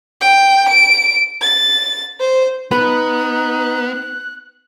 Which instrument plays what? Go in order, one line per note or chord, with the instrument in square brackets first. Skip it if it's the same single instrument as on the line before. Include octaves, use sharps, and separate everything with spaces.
[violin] G5
D7
A6
C5
[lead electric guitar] B3 [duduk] D#4 [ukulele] B4 [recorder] F#6